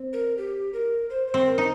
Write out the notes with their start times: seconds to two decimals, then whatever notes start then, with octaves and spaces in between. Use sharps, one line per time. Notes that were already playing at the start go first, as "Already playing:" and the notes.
Already playing: C4
0.13 A#4
0.37 G4
0.73 A#4
1.10 C5
1.28 C5
1.34 C4
1.46 A#4
1.58 D#4